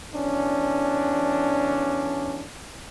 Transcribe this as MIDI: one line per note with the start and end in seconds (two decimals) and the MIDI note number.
0.14 2.44 40
0.14 2.44 61
0.14 2.44 62